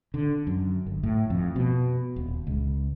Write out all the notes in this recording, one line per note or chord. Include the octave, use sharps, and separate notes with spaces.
D3
F#2
G1
A2
F2
B2
D#1
C#2